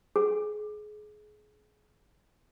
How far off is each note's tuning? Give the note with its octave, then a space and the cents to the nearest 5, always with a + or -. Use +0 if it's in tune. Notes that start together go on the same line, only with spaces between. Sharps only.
G#4 +25